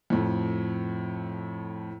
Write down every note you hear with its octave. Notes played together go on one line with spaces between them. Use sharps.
F2 A2